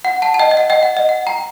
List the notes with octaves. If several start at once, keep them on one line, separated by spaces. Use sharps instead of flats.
F#5
F#5 A5
A5
D#5 G5
D#5
F#5
D#5 G5
F#5
D#5
F#5
G5 A#5